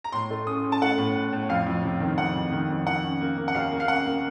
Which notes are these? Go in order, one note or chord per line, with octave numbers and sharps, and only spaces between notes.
A#5
A2 C6
A3
C#4 D#6
C#4
A5
A3 F#5
A2
A2
A2
F2 F5
F2
C3
D#3
F2 F#5
F2
D#3
F2
D#3 F#5
C#4
A#3
A#3
F#5
D#2 F5
A#3
F5
C#4 F#5
A#3